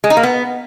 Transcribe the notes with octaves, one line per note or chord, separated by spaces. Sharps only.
G#3
D#4
A#3
B3